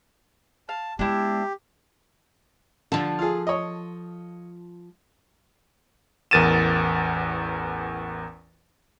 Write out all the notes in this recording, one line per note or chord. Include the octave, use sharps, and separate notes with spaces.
F5 A5
G#3 B3 D4 E4 G4
D3 F3 A4
F4 G#4
C#5 D#5
A1 E2 A#4 A6 D#7 E7